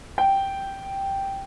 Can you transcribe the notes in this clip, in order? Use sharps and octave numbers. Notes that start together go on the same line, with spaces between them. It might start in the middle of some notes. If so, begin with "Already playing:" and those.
G5